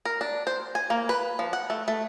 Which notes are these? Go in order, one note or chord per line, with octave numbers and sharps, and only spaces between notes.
A#4
D4
C5
G#5
A#3
B4
F3
F#5
A3
A3